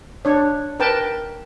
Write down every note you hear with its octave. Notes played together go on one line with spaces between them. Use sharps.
D4 C#5
A#4 B4 G5 A5